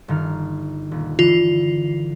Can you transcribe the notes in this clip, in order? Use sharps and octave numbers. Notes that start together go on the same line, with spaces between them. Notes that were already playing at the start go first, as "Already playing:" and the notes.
G1 D#3 F6
D#1
D3 E3 F4